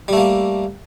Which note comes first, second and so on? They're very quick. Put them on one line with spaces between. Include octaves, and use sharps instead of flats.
G3 A3 A#3